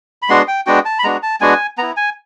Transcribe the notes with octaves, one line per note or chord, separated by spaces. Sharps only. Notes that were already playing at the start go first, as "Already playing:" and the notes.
B5
G#3 B3 D4 F#4 C6
G5
G#3 B3 D4 F#4 G5
A5
B5
G#3 B3 D4 F#4 A#5
A5
G#3 B3 D4 F#4 G#5
B3 E4 A#5
G#5